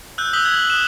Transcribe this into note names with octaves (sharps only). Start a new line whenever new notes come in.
E6 F#6 G6
D#6 E6 F#6 B6 F#7 G7
G#6 F#7
D#6 F#6 E7